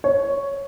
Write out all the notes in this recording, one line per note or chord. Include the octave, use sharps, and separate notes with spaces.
C#5